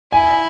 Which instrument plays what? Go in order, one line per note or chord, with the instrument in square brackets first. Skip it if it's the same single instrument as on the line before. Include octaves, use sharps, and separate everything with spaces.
[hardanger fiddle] E4 [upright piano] G#5